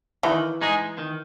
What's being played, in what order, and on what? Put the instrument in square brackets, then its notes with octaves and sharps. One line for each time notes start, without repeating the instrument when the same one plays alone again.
[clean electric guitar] D#3 [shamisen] E3
[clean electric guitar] G#3 D#4 G#4
D#3